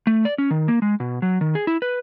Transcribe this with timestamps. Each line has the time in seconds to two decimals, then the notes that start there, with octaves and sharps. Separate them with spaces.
0.07 A3
0.25 D5
0.38 C#4
0.51 D#3
0.68 A#3
0.82 G#3
1.00 B2
1.22 F#3
1.41 D#3
1.55 G#4
1.67 E4
1.82 B4